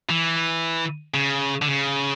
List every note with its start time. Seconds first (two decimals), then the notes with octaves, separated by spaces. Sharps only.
0.10 E3
1.14 C#3
1.62 D3
1.67 C#3